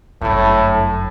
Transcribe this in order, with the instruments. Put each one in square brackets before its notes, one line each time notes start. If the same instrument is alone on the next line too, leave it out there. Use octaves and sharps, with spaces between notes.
[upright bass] G1 F#2 [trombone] A2